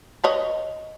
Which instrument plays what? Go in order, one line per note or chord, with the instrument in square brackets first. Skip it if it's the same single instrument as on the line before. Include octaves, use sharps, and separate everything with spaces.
[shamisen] B4 C#5 D#5